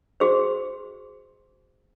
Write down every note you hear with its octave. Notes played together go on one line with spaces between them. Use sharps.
F#4 G#4 C5